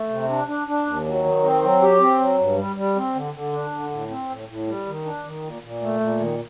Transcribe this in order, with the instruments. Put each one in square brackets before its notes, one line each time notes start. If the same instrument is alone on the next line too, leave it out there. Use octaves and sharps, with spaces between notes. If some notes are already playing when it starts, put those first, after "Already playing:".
Already playing: [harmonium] A3
C3
D4
D4
D4
D#2
F#3
D#3
C4
F#3
G4
C4
F#3
G2
G3
G3
C4
D3
D3
D4
D3
A2
C4
A2
A2
G3
D#3
D4
D#3
A#2
A#2
A3
A#2
D#3